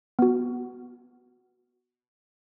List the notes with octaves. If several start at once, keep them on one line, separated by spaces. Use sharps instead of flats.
B3 F#4